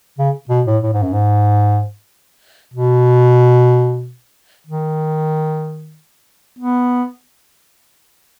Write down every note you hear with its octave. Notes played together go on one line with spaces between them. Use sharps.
C#3
B2
A2
A2
G#2
F#2
G#2
B2
D#3
B3